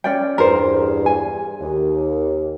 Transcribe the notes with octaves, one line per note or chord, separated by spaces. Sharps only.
C#4 D5 G5
E2 G2 A#4 C5
G#5
D#2